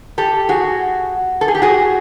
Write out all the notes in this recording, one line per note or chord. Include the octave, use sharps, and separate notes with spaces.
G4 A4
F#4 G#4
A4
G#4
G4
F#4 G#4